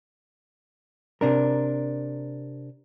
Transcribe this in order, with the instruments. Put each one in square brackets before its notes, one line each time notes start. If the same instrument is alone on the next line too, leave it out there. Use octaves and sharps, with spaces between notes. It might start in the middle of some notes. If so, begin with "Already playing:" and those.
[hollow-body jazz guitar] C3 D4 A#4